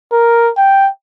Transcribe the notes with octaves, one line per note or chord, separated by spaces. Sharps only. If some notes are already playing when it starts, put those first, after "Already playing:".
A#4
G5